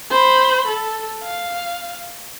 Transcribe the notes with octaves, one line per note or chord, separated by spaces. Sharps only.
C5 B5
A4
F5